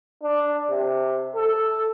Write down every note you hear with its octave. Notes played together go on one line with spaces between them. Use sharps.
D4
C3
A4